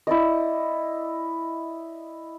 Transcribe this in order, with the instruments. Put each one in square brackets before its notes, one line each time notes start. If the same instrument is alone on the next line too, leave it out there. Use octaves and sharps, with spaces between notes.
[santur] E4 D5 D#5